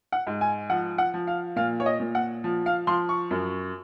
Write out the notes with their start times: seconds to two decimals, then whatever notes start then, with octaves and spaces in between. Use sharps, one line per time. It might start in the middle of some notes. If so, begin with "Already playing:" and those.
0.12 F#5
0.27 G#2
0.41 G#5
0.70 F3 F#5
0.98 F#5
1.14 F3
1.27 F5
1.56 A#2 F5
1.80 C#5
1.86 D#5
2.00 A#2
2.15 F#5
2.44 F3
2.66 F5
2.87 F3 C6
3.09 C#6
3.31 F#2